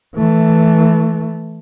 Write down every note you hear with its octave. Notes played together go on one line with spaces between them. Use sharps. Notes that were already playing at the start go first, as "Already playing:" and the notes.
E3 A3